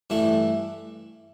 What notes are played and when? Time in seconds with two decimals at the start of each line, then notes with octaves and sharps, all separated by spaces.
0.10 G2 E3 A3 E4